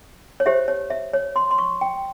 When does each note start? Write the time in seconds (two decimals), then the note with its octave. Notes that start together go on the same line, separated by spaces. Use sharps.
0.40 C#5
0.46 G4 C5 E5
0.68 C#5
0.90 E5
1.14 C#5
1.36 C6
1.51 C6
1.58 C#6
1.81 G5